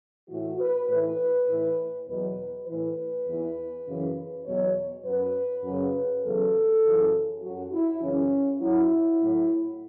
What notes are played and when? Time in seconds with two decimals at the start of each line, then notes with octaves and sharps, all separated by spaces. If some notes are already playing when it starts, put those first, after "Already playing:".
0.29 A2 E3 F#4
0.59 B4
0.88 A2 E3 B4
1.48 A2 E3
2.07 E2 B2 F#3 B4
2.67 A2 E3 B4
3.26 E2 E3
3.86 F#2 C#3 E3
4.45 E2 B2 F#3 C#5
5.04 F#2 F#3 B4
5.64 F#2 C#3 F#3
6.23 E2 C#3 F#3 A4
6.83 F#2 C#3 E3
7.42 F#2 F#3 F#4
7.71 E4
8.01 F#2 C#3 E3 C#4
8.61 F#2 F#3 E4
9.20 A2 F#3